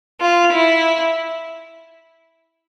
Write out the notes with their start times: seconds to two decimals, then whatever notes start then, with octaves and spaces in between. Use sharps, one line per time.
0.21 F4
0.53 E4